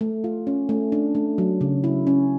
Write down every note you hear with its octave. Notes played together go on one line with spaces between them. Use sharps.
A3
F4
C#4
A3
D4
A3
F#3
C#3
E4
C#4